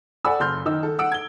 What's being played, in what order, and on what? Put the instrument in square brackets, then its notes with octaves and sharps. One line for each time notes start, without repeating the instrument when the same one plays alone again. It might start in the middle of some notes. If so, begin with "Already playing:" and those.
[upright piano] A4 D5 F#5 G#5 B5 E6
F#1 C6 F6 G6
D#3 D#4 E6
A4
F#5 E6 D7
G#6 G7